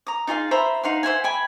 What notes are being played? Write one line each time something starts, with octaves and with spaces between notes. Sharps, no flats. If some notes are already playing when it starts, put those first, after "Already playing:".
A#5 D#6
D#4 F4 G#4 F5
C5 E5 A#5 B5
D#4 F5 F#5 C6
C5 E5 F#5 G#5
G5 G#5 B5